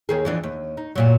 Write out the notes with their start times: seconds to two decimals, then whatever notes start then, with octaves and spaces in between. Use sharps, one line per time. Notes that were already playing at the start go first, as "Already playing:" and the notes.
0.09 D#2 D#3 G#4
0.25 F2 E3 D4
0.43 D#2
0.77 D#4
0.95 F#2 A#2 F#3